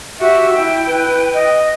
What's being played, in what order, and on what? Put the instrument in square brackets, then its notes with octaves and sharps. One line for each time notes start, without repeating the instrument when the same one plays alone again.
[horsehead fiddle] F#4 G4 [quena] E5
[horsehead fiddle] E4 G5
[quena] B4
D#5